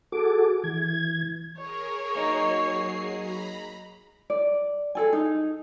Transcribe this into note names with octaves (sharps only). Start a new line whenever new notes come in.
F#4 G#4 A4 D6
E3 G#6
G#4 A#4 C#5
F#3 A#3 D#4 G#4 C7
A#5 B5
D5
G#4 A4 G#5
D#4